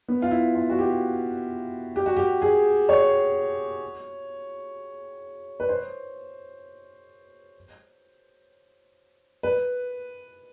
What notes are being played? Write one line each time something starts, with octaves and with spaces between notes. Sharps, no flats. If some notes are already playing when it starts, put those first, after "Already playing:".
B3
F4
E4
F4
F#4
G4
G4
F#4
G4
G#4
C#5
B4
C5
B4